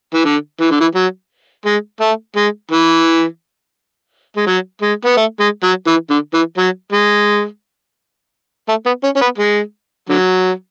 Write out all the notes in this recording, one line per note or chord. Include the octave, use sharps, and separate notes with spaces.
E3
D3
E3
D3
E3
F#3
G#3
A3
G#3
E3
G#3
F#3
G#3
B3
A3
G#3
F#3
E3
D3
E3
F#3
G#3
A3
B3
C#4
C#4
B3
G#3
D3 F#3